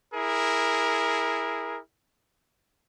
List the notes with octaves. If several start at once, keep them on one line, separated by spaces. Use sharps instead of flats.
E4 G#4 A#4